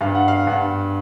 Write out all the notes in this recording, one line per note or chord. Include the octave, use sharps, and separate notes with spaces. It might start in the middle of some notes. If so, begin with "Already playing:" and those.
G2 F5
F#5
F5
G2 F#5